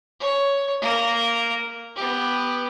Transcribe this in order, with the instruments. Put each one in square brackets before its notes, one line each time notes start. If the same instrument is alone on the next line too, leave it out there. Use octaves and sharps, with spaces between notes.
[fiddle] C#5
A#3 A#4
B3 G4